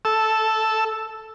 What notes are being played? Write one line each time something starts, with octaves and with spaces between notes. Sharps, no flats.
A4 E6